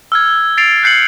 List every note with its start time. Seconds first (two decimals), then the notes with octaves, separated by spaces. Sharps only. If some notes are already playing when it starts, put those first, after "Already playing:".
0.12 E6 F6 G#6
0.57 A6 C7 D7 F7
0.83 F#6 G6 C7 C#7 F#7